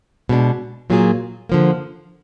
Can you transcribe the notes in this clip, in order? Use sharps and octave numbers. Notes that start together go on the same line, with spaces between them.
B2 G#3 D4
A#2 F#3 A#3 F4 G#4
D3 F3 A#3